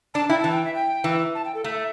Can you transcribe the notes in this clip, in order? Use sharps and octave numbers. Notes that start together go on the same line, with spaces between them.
D4 A5
E4 G5
E3 A5
G5
E5
G5
E3
A5
G5
A4
A3 E5